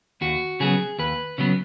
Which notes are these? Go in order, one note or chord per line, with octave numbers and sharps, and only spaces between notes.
D#2 F#4
C#3 F#3 B3 G#4
D#2 B4
C#3 F#3 B3